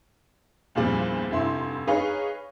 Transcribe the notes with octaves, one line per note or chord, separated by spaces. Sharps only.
E2 G2 A#2 F3 G3 C4
F1 G2 E4 C6
D#4 G#4 B4 C#5 F5 C#6